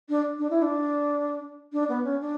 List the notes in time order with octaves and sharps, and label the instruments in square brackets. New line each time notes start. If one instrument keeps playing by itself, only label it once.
[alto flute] D4
D4
E4
D4
D4
B3
C#4
D4